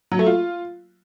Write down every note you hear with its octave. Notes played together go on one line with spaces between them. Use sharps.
F#3
A3
F4